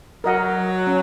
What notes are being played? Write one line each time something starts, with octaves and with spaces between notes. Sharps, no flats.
F#3 A#4 D#5 F#5
C#4